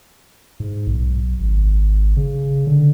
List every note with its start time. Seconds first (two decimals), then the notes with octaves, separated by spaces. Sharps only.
0.60 G#2
0.87 B1
1.40 G#1
2.17 C#3
2.67 D3